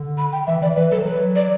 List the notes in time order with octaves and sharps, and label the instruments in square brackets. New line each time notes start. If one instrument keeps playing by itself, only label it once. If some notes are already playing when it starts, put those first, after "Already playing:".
Already playing: [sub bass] D3
[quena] B5
G5
[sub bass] E3 [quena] E5
[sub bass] E3 [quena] D5
[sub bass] E3 [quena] B4
[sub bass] F#3 [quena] A4
[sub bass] F#3 [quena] B4
[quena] D5